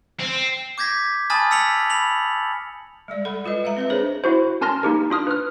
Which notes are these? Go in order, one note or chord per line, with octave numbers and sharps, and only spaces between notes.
C4
D6 G6 G#6 A#6 B6
G#5 A5 B5 D#6 F6 A6
E6 B6 C#7 F7 F#7
B5 F7 F#7
G3 G#3 D5
A4 F#5 B5
G#3 F4 B4 D#5
G#3 E5 F5 A#5
C4 B4 E5
D4 G#4 A#4 C5 C#5
E4 F#4 C5
C#4 A#4 A5 C6 F6 A#6
A#3 D#4 G4 A#4
D4 F4 D#6 F6
B4 F6